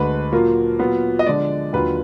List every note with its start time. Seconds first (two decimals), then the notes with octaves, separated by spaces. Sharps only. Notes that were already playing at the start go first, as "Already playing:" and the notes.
Already playing: D2 D3 G#3 B4
0.32 A#2 F#3 A#3 F4
0.79 A#2 F#3 B3 F4
1.19 D#5
1.26 D3 F3 G#3 D5
1.73 D#2 D3 F#3 A#3 F4 B4